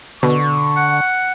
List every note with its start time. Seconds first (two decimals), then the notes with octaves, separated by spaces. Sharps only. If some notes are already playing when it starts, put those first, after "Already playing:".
0.23 B2 D3 C#6
0.76 F#5